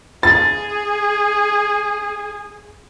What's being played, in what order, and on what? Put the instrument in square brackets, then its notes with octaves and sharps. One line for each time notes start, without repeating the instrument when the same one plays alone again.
[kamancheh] G#4 [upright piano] A6